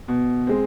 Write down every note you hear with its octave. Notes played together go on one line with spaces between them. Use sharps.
B2
G#3 C4